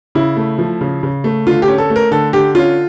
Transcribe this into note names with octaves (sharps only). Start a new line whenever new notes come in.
C#3 E4
A3
F3
C#3
C#3
A3
D3 F4
G4
C#4
A4
A3
A#4
D3 A4
D3 G4
C#4 F4